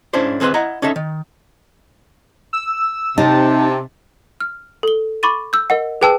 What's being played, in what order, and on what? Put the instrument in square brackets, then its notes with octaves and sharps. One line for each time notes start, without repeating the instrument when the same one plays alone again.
[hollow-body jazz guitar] G#2 C#4 D4 E4 C5
D#2 C4 G#4 B4 C6
E4 D#5 F#5 A#5
C#4 D#4 A4 E5
D#3
[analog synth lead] E6
[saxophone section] C3 [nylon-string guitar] D#4 [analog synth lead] A5
[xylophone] F6
A4 G7
B5 C#6 D6 A6 D#7
E6 G6
A#4 D#5 F#5
G#4 B4 G5 A5 E6